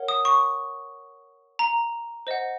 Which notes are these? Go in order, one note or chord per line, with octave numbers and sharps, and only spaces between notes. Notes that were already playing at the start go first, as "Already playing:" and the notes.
Already playing: A#4 C#5 F#5
D#6
C#6
A#5
C5 D#5 F#5